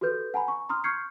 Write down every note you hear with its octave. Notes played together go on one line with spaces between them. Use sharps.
F#4 G4 A4 B4 G6
F#5 G#5 A#5 B5
C#6
A#5 C6 D#6 F6
C#6 F6 G6 G#6 C7 C#7